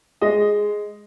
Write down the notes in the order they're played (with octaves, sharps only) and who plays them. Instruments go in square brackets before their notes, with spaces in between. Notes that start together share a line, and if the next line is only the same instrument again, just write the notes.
[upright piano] G#3 D#5